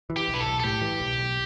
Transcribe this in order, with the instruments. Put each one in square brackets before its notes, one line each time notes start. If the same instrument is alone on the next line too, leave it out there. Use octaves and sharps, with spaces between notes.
[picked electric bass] E3
[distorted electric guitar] G4
[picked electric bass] B1
[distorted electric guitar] B4
A4
[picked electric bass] B1
[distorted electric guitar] A4
[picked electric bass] A2 [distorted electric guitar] G4
[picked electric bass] E3
B1
B1